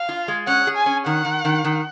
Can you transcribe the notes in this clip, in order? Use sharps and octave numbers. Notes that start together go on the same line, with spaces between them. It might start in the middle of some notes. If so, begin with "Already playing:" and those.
Already playing: F5
F4
G#3
C#4 F#5
G#4
G#5
C#4
D#3 F#5
D#3
D#3
D#3